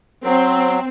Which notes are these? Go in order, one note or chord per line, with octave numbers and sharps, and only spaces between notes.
F#3 C4